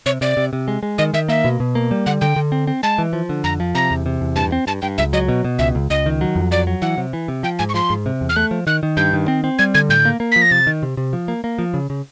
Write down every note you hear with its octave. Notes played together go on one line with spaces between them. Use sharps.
C3 C#5
C3 D5
C3
C3
G#3
G#3
D#3 D#5
D#3 E5
A#3 E5
B2
B2
A#3
G3
D3 F#5
D3 G5
D3
C4
C4
G#3 A5
E3
F3
D3
F2 A#5
F3
C3 A#5
E2
C3
E2
G2 A5
C4
G2 A5
G2 G5
C#2 E5
F#3 D#5
B2
B2
C#2 E5
C#2
C#2 D#5
D#3
F#3
F2
F#3 D5
F#3
E3 F#5
C3
E3
C3
F3 G5
G#2 G#5
C#6
F3 C6
G#2
C3
E2
F6
A3 F#6
F3
D#3 F#6
D#3
G2 G6
D#3
C4
C4
G3 G#6
D3 G#6
A2 G6
A#3
A#3
F3 B6
A#6
C3 A6
D#3
C3
C3
F3
A#3
A#3
F3
C#3
C#3